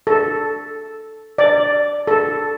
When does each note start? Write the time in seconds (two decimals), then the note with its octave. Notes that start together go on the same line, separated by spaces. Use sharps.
0.07 A4
1.38 D5
2.07 A4